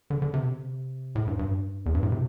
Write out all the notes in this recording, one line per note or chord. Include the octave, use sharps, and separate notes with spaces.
D3
D3
C3
A2
G2
G2
E2
G2
A2
C3